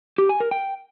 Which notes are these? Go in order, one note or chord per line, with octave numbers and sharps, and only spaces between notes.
G4
G#5
A#4
G5